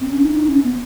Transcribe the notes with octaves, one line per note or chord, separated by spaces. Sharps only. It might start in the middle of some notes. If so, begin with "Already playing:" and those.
C4
C#4
D#4
D#4
C#4
B3